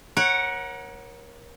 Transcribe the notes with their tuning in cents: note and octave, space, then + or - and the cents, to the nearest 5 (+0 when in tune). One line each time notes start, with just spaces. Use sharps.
A#4 +30 C#5 -15 F#5 +0